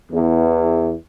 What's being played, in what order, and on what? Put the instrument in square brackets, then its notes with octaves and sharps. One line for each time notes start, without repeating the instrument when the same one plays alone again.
[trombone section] E2